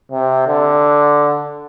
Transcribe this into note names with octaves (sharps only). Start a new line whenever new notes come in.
C3
D3